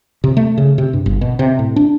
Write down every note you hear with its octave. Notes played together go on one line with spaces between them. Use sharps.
C3
A3
C#3
C3
G2
G1
B2
C3
A2
D4